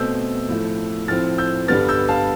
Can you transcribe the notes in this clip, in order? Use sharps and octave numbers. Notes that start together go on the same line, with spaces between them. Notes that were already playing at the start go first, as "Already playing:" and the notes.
Already playing: B2 A3 C4 E6 G6
A2 F3 A3
A2 F3 C4 F6 A6
E6 G6
G2 D3 G3 B3 F6 A6
E6 G6
F5 A5